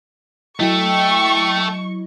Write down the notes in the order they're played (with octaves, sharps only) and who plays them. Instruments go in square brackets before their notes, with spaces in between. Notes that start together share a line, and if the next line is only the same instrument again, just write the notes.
[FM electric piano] F#3 E4 D#5 [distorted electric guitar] A3 A4 [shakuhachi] G5 [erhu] C#6